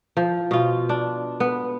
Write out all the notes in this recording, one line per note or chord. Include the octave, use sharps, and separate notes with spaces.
F3
B2 F4
D4
B3